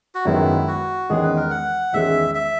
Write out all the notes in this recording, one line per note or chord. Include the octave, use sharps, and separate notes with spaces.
F#4
F#2 D#3 G#3 B3 E4
F#4
E2 D#3 G#3 C#4 G#4
B4
A#4
F#5
E2 D#3 G#3 C#4 G#4 E5
E5